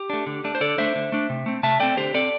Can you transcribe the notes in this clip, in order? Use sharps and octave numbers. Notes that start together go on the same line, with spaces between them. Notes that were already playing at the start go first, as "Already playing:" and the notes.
Already playing: G4
A3 D4
D3
A3 D4
C5
D3 A4 D5
A3 D4 C5 E5
D3
A3 D4
C3
A3 C4
C3 E5 A5
A3 C4 D5 G5
D3 G4 C5
C4 A4 D5